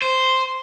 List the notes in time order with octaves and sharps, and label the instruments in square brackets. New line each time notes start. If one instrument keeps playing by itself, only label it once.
[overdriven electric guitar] C5